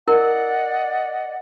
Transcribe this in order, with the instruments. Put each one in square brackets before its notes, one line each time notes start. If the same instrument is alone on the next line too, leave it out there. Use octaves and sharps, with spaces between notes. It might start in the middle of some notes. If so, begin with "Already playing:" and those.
[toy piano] E4 A#4 [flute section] D5 D#5 F#5